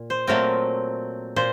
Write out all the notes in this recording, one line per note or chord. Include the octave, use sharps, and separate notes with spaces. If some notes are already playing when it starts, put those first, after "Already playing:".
Already playing: A#2
C5
A#2 F#3 A3 C4 A#4
A#2 C5